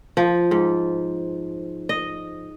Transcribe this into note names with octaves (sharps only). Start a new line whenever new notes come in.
F3
G#2
D#5